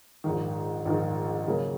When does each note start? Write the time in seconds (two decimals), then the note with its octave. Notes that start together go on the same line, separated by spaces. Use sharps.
0.24 A#1 G#2 D#3
0.85 A#1 G#2 D#3
1.47 C#3 F#3 A#3